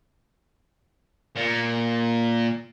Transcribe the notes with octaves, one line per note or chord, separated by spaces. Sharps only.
A#2